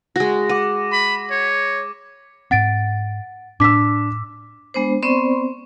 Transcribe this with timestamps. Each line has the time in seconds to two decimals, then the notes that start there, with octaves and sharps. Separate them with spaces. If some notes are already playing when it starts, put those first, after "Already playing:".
0.16 G#3 F#4 A#6
0.49 F#5 D6 D#7
0.92 B5
1.31 C#5
2.51 G#2 C4 F#5 A6 D7
3.60 A2 D4 D6 E6 B6
4.74 G#3 B3 D4 C5
5.02 B3 C4 C5 D5 C6 C#6